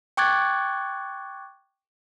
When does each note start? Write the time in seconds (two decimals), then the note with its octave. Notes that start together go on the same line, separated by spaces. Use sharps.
0.17 G5 C#6 D6 F#6 G#6 A6